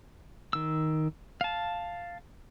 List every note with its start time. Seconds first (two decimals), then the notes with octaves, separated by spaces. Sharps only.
0.53 D#3 E6
1.41 F5 A5